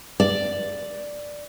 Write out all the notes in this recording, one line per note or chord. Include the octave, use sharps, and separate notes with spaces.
D5